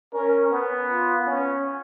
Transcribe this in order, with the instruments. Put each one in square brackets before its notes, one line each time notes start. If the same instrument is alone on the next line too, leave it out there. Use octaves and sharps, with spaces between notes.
[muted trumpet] C#4 [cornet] A#4
[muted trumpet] B3
[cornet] F4
[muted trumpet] C#4